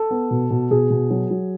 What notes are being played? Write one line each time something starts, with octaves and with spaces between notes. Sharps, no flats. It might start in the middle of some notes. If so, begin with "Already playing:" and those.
Already playing: A4
B3
B2
B2
B2 G#4
B2
F#3
F#3